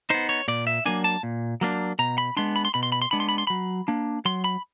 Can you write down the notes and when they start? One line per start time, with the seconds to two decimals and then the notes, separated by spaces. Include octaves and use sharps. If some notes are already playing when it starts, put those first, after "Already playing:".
0.10 B3 D#4 C5
0.29 C#5
0.48 A#2 D5
0.67 E5
0.86 F#3 A#3 D4 G#5
1.04 A5
1.23 A#2
1.61 F#3 A#3 D4
1.99 B2 A#5
2.18 B5
2.37 G#3 B3 D4 C6
2.56 B5
2.65 C6
2.74 B2 B5
2.83 C6
2.92 B5
3.02 C6
3.11 G#3 B3 D4 B5
3.20 C6
3.29 B5
3.38 C6
3.47 F#3 B5
3.88 A#3 D4
4.25 F#3 C6
4.44 B5